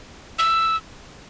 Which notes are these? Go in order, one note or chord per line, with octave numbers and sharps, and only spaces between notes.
E6